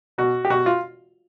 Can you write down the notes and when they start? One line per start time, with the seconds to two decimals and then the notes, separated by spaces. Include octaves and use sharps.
0.18 B2 F#4
0.45 G4
0.50 B2 F#4
0.66 F4